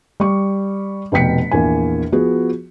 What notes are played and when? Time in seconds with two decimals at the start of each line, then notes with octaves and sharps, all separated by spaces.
0.20 G3 C#6
1.12 F1 B2 G5 B6 C#7
1.51 A#1 E2 A#3 G#5
2.12 F3 B3 F#4 G#4